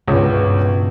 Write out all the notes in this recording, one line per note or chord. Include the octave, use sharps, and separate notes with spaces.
C#2 G2 B2